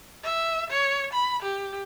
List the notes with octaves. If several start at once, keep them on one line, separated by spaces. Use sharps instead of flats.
E5
C#5
B5
G4